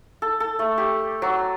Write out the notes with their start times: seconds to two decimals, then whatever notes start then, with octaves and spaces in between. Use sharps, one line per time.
0.22 A4
0.40 A4
0.59 A3
0.78 G4
1.22 F#3